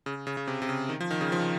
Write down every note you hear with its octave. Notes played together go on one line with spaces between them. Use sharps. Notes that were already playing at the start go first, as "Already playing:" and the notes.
C#3
C#3
C#3
C3
C3
C#3
D#3
F3
D#3
C#3
F3
D#3